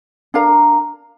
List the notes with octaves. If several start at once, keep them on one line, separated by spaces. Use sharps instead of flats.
D4 A#4 F5 A#5